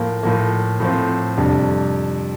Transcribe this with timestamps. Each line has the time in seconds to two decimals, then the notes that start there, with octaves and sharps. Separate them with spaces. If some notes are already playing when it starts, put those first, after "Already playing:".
Already playing: A2 F3 A#3
0.23 A2 F3 A#3
0.80 A2 F3 C4
1.38 F2 C3 G3 D4